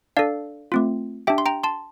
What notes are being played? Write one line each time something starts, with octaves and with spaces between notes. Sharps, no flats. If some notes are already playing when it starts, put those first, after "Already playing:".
D4 A4 D5 F5
A3 C4 F4
D4 G4 E5 G5
C6
G5 A#5
A5 C6